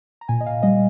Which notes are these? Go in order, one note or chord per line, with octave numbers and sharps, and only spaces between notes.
A#5
A#2 G#5
D#5
F5
G3 D#5